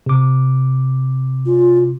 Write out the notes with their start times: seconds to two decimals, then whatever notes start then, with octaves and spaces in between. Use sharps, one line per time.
0.06 C3 D6
1.46 F4